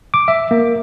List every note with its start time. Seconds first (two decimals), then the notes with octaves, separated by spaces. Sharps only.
0.14 D6
0.28 E5
0.51 A#3